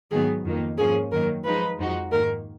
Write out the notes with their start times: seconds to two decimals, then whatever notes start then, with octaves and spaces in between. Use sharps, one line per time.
0.11 G#2 D#3 F#3 B3 G#4
0.45 F2 D#3 A#3
0.78 G#2 F3 A#3 C#4 G#4
1.12 F#2 D#3 F#3 A#3 A#4
1.45 F3 G#3 D#4 B4
1.79 F2 F3 G#3 D#4 F#4
2.11 G#2 D#3 A#3 A#4